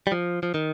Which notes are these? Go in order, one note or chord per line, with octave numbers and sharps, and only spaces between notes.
G3
F3
F3
D#3